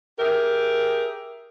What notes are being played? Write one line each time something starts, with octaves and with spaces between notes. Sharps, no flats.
G4 G#4 A#4 E5